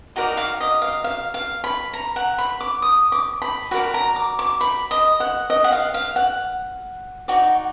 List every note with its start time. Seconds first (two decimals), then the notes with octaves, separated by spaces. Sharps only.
0.16 D#4 F#4 A#4 D5
0.37 F5
0.61 D#5
0.82 F5
1.04 F5
1.34 F5
1.64 B5
1.93 A#5
2.16 F#5
2.38 B5
2.61 D6
2.82 D#6
3.12 D6
3.42 B5
3.71 F#4 A#4 D5 B5
3.94 A#5
4.16 D6
4.39 D6
4.61 B5
4.91 D#5
5.20 F#5
5.50 D#5
5.64 F#5
5.72 F5
5.94 F5
6.16 F#5
7.28 D#4 F#4 D5